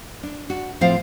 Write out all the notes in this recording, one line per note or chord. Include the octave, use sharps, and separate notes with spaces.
D4
D4 F#4
A2 F3 C4 F4 C5 F5